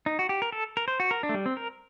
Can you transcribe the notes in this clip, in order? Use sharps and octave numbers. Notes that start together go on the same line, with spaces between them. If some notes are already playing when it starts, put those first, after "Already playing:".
D#4
F#4
G4
A#4
A4
A#4
C5
F#4
A#4
D4
A3
G3
C4
A#4